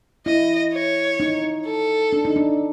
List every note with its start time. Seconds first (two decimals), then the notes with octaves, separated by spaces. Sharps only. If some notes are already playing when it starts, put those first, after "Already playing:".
0.26 E4 D#5
0.73 C#5
1.20 D#4
1.66 A4
2.13 D4
2.25 D#4
2.36 D4